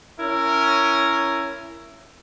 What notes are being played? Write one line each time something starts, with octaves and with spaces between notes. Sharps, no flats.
C#4 E4 A#4